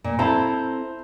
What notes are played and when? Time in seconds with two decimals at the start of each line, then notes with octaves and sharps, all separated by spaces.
0.04 A#2
0.19 C4 E4 A4 C5 A#5 B5